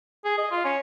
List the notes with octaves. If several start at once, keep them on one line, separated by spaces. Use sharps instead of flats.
G#4
D#5
F4
C#4